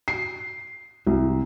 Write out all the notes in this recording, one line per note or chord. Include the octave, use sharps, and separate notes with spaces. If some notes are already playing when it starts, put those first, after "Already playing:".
C7
C2